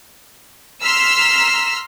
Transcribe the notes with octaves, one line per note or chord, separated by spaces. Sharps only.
A#5 C6 E6 F6 B6